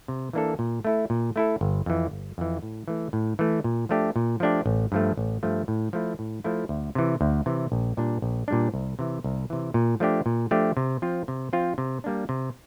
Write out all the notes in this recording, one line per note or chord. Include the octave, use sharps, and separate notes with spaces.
C3
E3 A#3 D4 A4
A#2
A3 E4 A4
A#2
A3 E4 A4
G1
F2 E3
G1
F2 E3
A2
E3 A3
A2
E3 A3
A#2
F3 A3 D4 G4
A#2
F3 A3 D4 G4
A1
G2 F3 A3
A1
G2 F3 A3
A2
F3 A3 E4
A2
F3 A3 E4
D2
C3 E3
D2
C3 E3
A#1
A#2 G3 D4
A#1
A#2 G3 D4
C2
C3 E3
C2
C3 E3
A#2
F3 A3 D4 G4
A#2
F3 A3 D4 G4
C3
F3 C4 F4
C3
F3 C4 F4
C3
G3 A#3 D4
C3